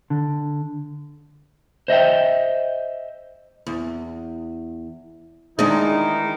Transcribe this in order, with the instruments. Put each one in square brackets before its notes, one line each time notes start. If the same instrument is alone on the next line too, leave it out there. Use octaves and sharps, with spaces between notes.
[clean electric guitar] D3
C5 D#5 E5 G5
[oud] E2
[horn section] D#3 E3 D#4 [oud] G#3 D4